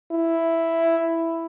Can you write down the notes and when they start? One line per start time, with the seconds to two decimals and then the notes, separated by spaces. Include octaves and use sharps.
0.12 E4